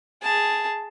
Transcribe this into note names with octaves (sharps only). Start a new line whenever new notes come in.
G#4 A5